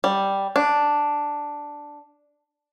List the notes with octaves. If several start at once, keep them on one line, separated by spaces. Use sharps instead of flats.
G3
D4